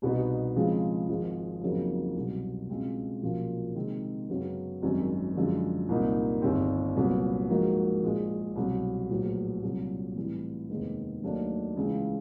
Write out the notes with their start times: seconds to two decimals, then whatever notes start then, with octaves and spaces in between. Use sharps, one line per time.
0.02 C2 B2 G3 B3 D#4
0.56 C#3 F3 G#3 C4
1.09 G#1 G#2 F3 G#3
1.62 F2 C#3 F#3 A#3 D#4
2.16 C2 B2 F#3
2.69 C#2 B2 G#3 C4
3.22 B1 A#2 F3 A#3 C#4
3.75 C3 D#3 G#3 C4
4.29 F#2 C#3 F#3 B3
4.82 G#1 F#2 D#3 G3 C4
5.36 F#2 D3 F3 G#3
5.89 C2 A#2 G3 A#3 D#4
6.42 G1 G2 D#3 G3 C4
6.96 C2 A#2 F#3 B3
7.49 G#2 F3 A#3 D#4 F#4
8.03 A#1 A#2 F3 G#3
8.55 C2 B2 F#3
9.10 A#1 A2 F#3 B3
9.63 C2 A#2 F#3
10.16 A2 E3 G3 C4 E4
10.70 F1 D#2 D#3 G#3 B3
11.23 D#2 D#3 F#3 A3 D4
11.76 C#2 C#3 E3